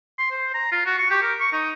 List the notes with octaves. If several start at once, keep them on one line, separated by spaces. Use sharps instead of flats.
C6
C5
A#5
F4
F#4
C#6
G4
A#4
C#6
D#4